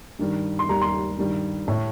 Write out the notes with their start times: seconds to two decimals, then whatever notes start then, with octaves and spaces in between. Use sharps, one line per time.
0.19 G2 D#3 G3
0.59 C6
0.69 D#2 D#3 G3 A#5
0.82 C6
1.18 G2 D#3 G3
1.68 A2 A3